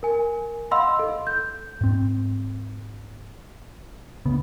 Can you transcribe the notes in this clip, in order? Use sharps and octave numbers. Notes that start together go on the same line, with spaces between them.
A#4 G#5
D#5 F5 F#5 B5 C6 E6
A4
G6
G#2 C4
D2 C#3 B3